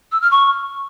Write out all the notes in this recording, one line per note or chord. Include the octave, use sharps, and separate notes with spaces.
E6
F6
C#6